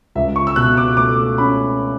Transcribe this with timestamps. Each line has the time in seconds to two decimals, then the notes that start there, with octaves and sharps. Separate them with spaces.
0.15 C#2 E5
0.36 C#6
0.47 E6
0.56 B2 F#6
0.77 D6
0.97 A3 D6
1.38 C#4 B5